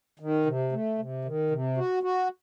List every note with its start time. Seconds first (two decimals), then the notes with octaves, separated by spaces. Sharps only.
0.20 D#3
0.46 C3
0.72 A3
0.98 C3
1.25 D#3
1.51 C3
1.77 F#4
2.03 F#4